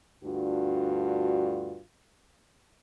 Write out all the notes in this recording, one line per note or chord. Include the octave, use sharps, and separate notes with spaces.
D2 G2 D4 F4 F#4